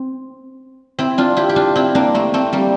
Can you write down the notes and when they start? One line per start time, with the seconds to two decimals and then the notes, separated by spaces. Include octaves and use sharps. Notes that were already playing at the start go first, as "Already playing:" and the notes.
Already playing: C4
0.99 C4 E4
1.18 D4 F4
1.37 E4 G4
1.49 G4
1.56 D4 F4
1.75 C4 E4
1.95 A#3 D4
2.14 A3 C4
2.34 A3 C4
2.53 G3 A#3